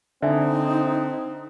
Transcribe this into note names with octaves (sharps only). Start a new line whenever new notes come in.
D3 C4 D#4 D5 E5 G#5